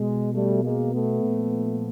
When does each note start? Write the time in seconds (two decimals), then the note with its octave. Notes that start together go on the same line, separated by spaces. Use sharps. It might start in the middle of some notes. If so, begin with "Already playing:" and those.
Already playing: B2 G#3
0.34 G3 A3
0.63 G#3 A#3
0.93 A3 B3
1.23 A#2 F3